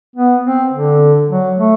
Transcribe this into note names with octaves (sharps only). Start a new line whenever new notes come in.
B3
C4
D3
F#3
A3